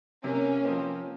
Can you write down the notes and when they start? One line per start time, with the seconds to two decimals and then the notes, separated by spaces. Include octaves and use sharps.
0.24 C3 A#3 C#4
0.65 F3 C4